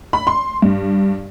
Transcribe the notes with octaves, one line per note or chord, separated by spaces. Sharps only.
B5
C6
G2